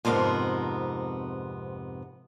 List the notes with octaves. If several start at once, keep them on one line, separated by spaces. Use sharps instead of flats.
F2 G#2 C3 B3 A#4